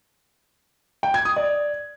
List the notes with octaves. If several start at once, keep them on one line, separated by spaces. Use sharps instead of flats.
G5
G#6
D#6
D5